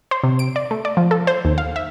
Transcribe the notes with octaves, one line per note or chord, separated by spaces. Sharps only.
C5
C3
D7
D5
A3
D5
F3
A4
C5
D#2
F5
E5